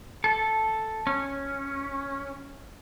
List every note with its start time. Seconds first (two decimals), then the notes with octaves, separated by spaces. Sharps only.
0.24 A4
1.07 C#4